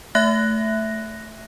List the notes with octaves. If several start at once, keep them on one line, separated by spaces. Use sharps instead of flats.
A3 E5 F#6 A#6